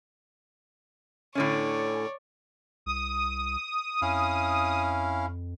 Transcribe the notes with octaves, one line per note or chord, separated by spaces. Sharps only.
A2 D3 C#4 C#5 D5
C2 D#6
F2 C#4 E4 F5